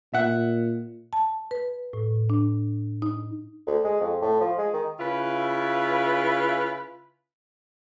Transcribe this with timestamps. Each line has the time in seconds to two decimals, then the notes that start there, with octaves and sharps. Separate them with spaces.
0.14 A#2 E5 F#5
1.13 A5
1.51 B4
1.93 A2
2.30 D4
3.02 D#4
3.67 D2
3.84 G#3
4.01 F2
4.21 A2
4.40 F3
4.58 G#3
4.73 D#3
5.00 C#3 E4 F4 B4